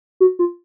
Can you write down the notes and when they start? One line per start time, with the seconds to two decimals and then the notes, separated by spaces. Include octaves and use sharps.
0.20 F#4
0.39 F4